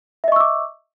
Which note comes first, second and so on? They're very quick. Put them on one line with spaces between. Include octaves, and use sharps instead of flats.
E5 D#5 C#6 E6 D6